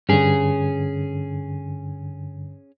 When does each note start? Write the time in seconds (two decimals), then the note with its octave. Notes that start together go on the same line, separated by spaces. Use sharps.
0.09 G2 D3 C#4 G#4